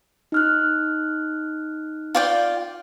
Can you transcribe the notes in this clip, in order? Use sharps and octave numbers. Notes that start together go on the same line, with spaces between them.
D#4 F6 F#6
F4 D5 G5